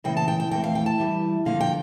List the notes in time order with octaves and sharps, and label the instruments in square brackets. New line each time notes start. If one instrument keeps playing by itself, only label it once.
[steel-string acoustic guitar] C#3 E3 A#3 G5
A5
G5
G5
F2 E3 A3 G5
F5
G5
A5
G2 E3 G3
G2 D3 F3 A#3 F5
G5